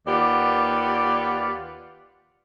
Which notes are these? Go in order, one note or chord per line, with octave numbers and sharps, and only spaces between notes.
D#2 F4 G4 B4 D5 F#5